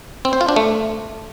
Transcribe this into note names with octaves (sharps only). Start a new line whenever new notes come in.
C4
C5
F4
D4
A3